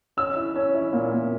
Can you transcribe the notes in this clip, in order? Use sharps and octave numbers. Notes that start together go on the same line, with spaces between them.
C#4 E6
E4
C#4
E4
A#2
A#2